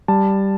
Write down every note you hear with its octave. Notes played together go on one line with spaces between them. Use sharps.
G3 A5